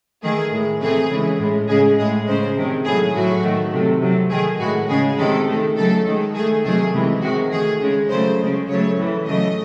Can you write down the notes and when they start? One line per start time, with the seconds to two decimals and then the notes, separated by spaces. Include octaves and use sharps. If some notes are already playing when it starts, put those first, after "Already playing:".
0.23 D#3 A3 G#4
0.52 A2 G#3
0.81 C3 E3 A3 G#4
1.10 C#3 E3 G#3
1.39 A2 G#3
1.69 C#3 G#3 G#4
1.98 A2 G#3 G#4
2.27 C#3 G#3 C5
2.56 C3 D#3 G#3
2.85 A2 F#3 A3 G#4
3.15 A2 F#3 A3 F#4
3.43 D#3 A3
3.73 C3 F#3 A3
4.01 C3 F#3 A3
4.31 D#3 A3 G#4
4.60 A2 G#3 F#4
4.89 C#3 G#3 G#4
5.18 C3 D#3 G#3 A4
5.47 D#3 A3
5.77 C#3 F#3 A3 A4
6.06 D#3 G#3
6.35 D#3 A3 G#4
6.64 C3 D#3 F#3 A3 G#4
6.94 C3 E3 G#3
7.22 C3 D#3 G#3 F#4
7.52 D#3 A3 G#4
7.81 C#3 G#3
8.09 C#3 F#3 A3 C5
8.39 C#3 G#3
8.68 C#3 F#3 A3 C#5
8.97 A2 E3 A3
9.27 C#3 F#3 A3 D#5